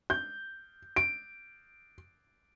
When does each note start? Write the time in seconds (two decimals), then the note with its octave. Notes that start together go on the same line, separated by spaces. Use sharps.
0.10 G6
0.96 D7